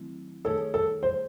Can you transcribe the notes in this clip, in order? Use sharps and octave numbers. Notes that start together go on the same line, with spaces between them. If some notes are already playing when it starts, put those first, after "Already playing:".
Already playing: D#3 F#3 A3 C4 E4
D#3 A3 D#4 G#4 A4 C#5
A4
C5